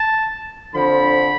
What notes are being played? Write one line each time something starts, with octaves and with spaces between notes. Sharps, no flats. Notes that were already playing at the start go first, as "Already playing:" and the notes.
Already playing: A5
D3 F3 C4 B5